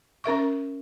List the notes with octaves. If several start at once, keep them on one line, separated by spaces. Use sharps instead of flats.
C#4 A#4 E5 C#6